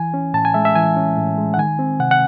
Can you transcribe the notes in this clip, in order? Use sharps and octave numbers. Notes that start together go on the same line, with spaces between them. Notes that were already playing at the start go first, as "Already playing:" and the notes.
Already playing: E3 G#5
C#4
A2 A5
G#5
G#3 E5
E5
E3 G#5
C#4
A2
G#3
F#5
D#3 G#5
C4
C3 F#5
F#5